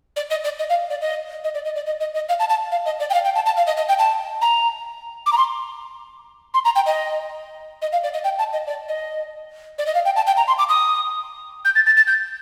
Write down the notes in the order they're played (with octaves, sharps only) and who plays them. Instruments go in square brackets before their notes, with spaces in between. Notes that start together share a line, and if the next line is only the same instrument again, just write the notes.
[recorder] D5
D#5
D5
D#5
F5
D5
D#5
D#5
D5
D#5
D5
D#5
D#5
D#5
F5
A5
A5
F5
D#5
D5
G5
F5
G5
A5
A5
F5
D#5
D#5
G5
A5
A#5
D6
A#5
C6
C6
A#5
G5
D#5
D#5
F5
D5
D#5
G5
A5
D#5
D5
D#5
D5
D#5
F5
G5
A5
G5
A#5
C6
D6
D#6
G6
A6
A6
A6
G6